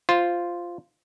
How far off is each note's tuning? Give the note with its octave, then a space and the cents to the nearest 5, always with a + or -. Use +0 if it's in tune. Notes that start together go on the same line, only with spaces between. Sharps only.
F4 +0 C5 +0